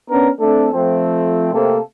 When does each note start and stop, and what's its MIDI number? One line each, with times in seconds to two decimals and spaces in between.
0.10 0.29 59
0.10 0.29 61
0.10 0.29 62
0.10 0.29 70
0.40 0.69 57
0.40 0.69 60
0.40 0.69 62
0.40 0.69 69
0.73 1.52 41
0.73 1.52 53
0.73 1.52 57
0.73 1.52 60
1.53 1.78 48
1.53 1.78 57
1.53 1.78 58
1.53 1.78 60
1.53 1.78 69